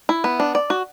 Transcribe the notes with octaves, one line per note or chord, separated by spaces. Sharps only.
E4
B3
D4
D5
F#4